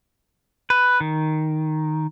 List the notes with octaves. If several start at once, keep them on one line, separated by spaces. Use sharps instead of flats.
B4
D#3